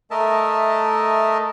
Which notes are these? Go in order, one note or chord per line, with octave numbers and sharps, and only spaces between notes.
A3 A#4 D#5 E5 A5